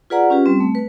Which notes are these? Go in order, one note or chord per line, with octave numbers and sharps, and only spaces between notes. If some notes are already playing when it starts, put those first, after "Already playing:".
F4 G#4 B4 D5 F#5 A#5
C#4 F4 G4 B4
G3 C4
A3
B4